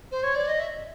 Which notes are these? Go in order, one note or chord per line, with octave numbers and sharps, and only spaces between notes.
C5
C#5
D5
D#5
E5